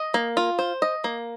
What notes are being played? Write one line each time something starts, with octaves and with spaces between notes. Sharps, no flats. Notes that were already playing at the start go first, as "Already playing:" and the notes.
Already playing: D#5
A#3
F4
C5
D#5
A#3